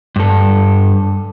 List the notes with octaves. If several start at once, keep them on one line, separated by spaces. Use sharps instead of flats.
G2 A4